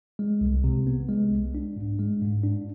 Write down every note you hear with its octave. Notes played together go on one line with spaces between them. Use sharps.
G#3
C2
C3
B3
G#3
C2
D4
G#2
G#3
G#2
D4